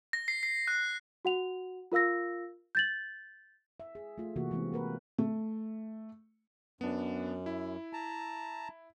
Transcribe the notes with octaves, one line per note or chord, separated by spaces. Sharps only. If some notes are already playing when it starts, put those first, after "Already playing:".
A#6
C7
C7
F#6
F#4 F#5 F7
F4 A#4 F5 E6 A#6
G6 A6 F#7
E5
G#4
A3 F4
C3 E3 A#3 F#4
E3 G#3 B3 C4
A#3 A#4 B4
A3
F#2 B3 D4
E4
A5 A#5